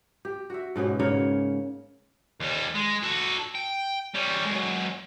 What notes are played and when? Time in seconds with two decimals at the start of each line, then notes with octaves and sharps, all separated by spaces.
0.25 G4
0.50 F#4 E5
0.76 G#2 B2 C#4 G4
0.99 G#2 C#3 A#3 C#5
2.40 D#2 G3
2.75 G#3
3.03 F#4 A4
3.55 G5
4.15 G3 C#4
4.46 F#3 G#3